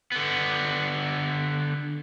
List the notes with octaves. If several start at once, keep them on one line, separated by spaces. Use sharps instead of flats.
D3 B3